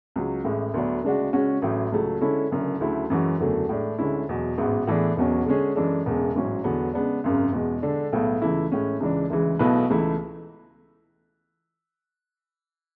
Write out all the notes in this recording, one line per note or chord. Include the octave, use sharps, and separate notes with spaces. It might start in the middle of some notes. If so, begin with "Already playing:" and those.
C#2 C#3 F#3
A1 A2 G#3
D2 D3 F#3 B3 D4
D2 C#3 G#3 D4 F#4
C#3 G#3 C#4 F#4
A1 A2 F#3
C#2 C#3 F#3 A3
D3 G#3 C#4 E4 A4
F#1 F#2 D3
D2 C#3 F#3 A3 E4
F#2 E3 G#3 C#4 F#4
F#1 E2 D3 F#3 A3
A2 G#3 D4
D2 D3 G#3 C#4 E4
E2 B2 F#3
A1 G#2 G#3 B3 F#4
A2 E3 B3 D4 G#4
E1 E2 B2 F#3 C#4
D3 G#3 C#4 G#4
F#2 E3 G#3 D4 A4
E1 E2 C#3 G#3
A1 G#2 F#3 C#4
E2 D3 F#3 B3
C#3 G#3 B3 D4
G#1 F#2 C#3
E2 B2 G#3
D3 G#3 D4 A4
B1 A2 G#3 B3
C#2 C#3 E3 A3 E4
A2 G#3 C#4
C#2 C#3 E3 G#3 D4
D2 C#3 E3 G#3
B1 B2 A3 E4 B4
C#2 C#3 E3 A3 E4